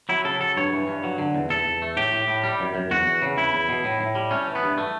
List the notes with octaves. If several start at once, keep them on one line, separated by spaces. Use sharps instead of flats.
F#3 E4
C#3 A4
F#3 A4
G2 C#5
E3
G2
F#3
D3
E2
E2 A4
E2
A3
A2 G4
A2
A2
G3
F#2
F#2
E2 F#4
E2
C#3
E2 E4
E2
B2
A2
A2
G3
A3 C#4
E3
B3
G2
A3